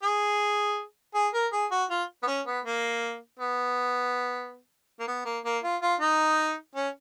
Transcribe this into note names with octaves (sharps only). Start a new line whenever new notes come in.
G#4
G#4
A#4
G#4
F#4
F4
B3
C#4
B3
A#3
B3
A#3
B3
A#3
A#3
F4
F4
D#4
C#4